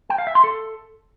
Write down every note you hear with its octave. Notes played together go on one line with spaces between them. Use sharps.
G5
F5
E5
C6
A4